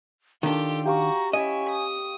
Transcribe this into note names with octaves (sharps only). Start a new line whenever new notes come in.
D#3 D4 F4 G4 A4
F#4 G4 F5 A#5 C#6
C#4 E4 D#5 G#5
D#6